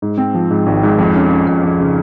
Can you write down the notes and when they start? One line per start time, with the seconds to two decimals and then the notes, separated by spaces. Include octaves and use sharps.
0.02 G#2
0.18 C4
0.34 F3
0.51 G#2
0.66 G#1
0.83 G#2
0.98 F2
1.15 C#4
1.31 C#4
1.47 F2
1.63 F2
1.80 C#3